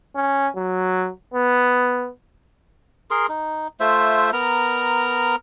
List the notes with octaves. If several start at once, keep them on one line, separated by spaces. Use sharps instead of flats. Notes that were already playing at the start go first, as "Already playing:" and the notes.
C#4
F#3
B3
G#4 A#4 C6
D#4
A3 F4 C5 E5
B3 A#4 A#5